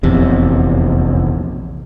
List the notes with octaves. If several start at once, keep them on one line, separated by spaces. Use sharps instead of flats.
F1 A#1 E2 C3